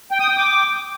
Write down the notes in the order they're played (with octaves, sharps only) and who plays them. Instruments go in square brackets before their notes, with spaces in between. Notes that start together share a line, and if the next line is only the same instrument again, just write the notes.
[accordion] G5
D#6
G5
D6